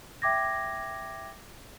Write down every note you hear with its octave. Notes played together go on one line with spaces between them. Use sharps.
E5 G5 D6 G#6 A#6